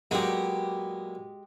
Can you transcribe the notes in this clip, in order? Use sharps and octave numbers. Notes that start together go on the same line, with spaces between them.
A#2 F#3 G#3 B3 G4